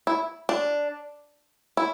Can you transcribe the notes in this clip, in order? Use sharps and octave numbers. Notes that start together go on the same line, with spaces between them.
E4
D4
E4